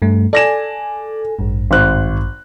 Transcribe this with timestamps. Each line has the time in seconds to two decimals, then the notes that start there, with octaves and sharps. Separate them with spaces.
0.02 G2 A3
0.33 A4 D5 G#5 A#6 E7
1.39 A1 G2
1.71 G#1 C5 F#6